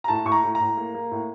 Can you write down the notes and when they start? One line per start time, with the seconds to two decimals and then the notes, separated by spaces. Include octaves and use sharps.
0.04 A#5
0.08 A2 A5
0.25 A2 C#6
0.32 A#5
0.44 A2
0.55 A#5
0.61 A2
0.77 A#3
0.94 A#3
1.11 A2